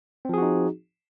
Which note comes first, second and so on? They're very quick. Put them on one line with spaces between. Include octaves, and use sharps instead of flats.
C4 F3 G#4 F#4 D#4